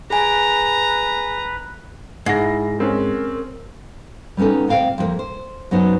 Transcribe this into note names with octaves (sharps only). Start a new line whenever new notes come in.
G#4 B4 G#5 A#5
G#2 E4 A#6 C7
G#3 C4 C#4 A#4
G3 B3 C#4 D#4 A4
D2 A#2 C4 F5 G5
F2 F3 G#3 A#3
C5
F#2 F#3 B3 D#4 C5 D#5